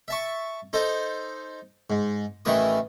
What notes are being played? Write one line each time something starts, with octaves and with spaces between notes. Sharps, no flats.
E5 A5 C#6
D#4 A4 C5
G#2
A1 D#3 E3 A3 E4 D#6